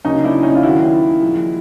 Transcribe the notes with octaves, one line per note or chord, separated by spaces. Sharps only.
C#3 F#3 A#3 C#4 D#4
D4 E4
C#4 D#4
F4
D#3 F#3 A#3 E4 F#4
A#2 F3 G#3